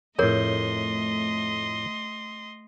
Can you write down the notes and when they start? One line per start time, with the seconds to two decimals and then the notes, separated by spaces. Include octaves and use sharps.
0.19 F2 A2 A3 G#4 A#4 C#5 D#5 C6